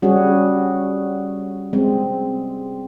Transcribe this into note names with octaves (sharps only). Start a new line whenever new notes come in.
G3 C#4 F#4 G#4
G#3 C4